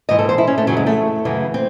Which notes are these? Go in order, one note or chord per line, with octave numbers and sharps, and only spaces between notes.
G#2 E3 D#5
A4
C5
E4
C#4
A3
F#2 C#3 E3 F#3
G#3
A3
F#2 C#3 E3
C4